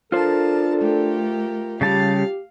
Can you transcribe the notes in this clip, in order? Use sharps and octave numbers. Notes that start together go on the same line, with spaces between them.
D4 F4 A4 A#4 C5 A5
A3 G4 A#4
C#3 G3 G4 F5 A5